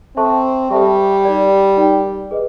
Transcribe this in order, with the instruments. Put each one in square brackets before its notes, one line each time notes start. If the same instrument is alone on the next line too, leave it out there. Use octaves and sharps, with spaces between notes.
[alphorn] C4 [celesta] A4 C5 E5 A5 C#6
[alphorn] G3 [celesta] A4 C5 E5 A5 C#6
[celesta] D#4 G4 A#4 D5 G5
D#4 G4 A#4 D5 G5
G#4 B4 D#5